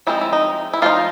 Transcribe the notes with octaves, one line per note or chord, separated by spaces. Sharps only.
F3 G#3 C4 D#4 E4
E4
D#4
E4
F3 G#3 C4 D#4 F4